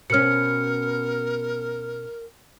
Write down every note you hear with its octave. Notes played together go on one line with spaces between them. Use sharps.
B2 C#4 A#4 F6 C#7